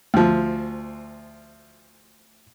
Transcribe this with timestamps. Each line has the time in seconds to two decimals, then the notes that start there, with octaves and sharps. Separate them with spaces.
0.14 D2 F3